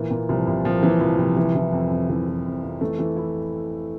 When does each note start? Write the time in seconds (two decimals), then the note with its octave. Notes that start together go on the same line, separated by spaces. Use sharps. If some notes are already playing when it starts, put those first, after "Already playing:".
Already playing: A#2 E3
0.11 A#2
0.29 C2 F3
0.47 C2
0.65 A#2 F3
0.83 A#2 E3
1.00 C2 F3
1.18 C2 F3
1.37 E3
1.55 E3
1.72 F2
1.91 F2
2.10 E3
2.27 E3
2.46 F2
2.63 F2
2.81 E3 A3
2.99 E3
3.17 E4